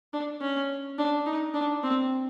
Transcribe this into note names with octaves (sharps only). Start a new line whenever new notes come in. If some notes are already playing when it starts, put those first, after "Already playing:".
D4
C#4
D4
D#4
D4
C4